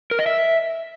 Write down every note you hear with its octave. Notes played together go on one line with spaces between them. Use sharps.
A#4
D#5
E5